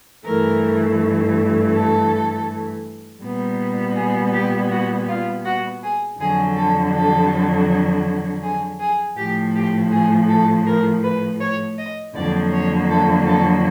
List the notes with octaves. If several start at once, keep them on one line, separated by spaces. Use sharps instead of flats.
G2 E3 A3 A#4
A4
A#2 G3 B3
G#4
G4
F#4
F4
F#4
G#4
F2 D3 F#3 G#4
A4
A4
G#4
G#4
A2 F3 A3 G4
G4
G#4
A4
A#4
B4
C#5
D#5
F2 D3 F#3 A#3 D5
C#5
A4
A4